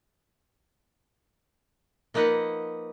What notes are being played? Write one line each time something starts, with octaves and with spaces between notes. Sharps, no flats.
F3 A#3 D#4 B4 D#5 F#5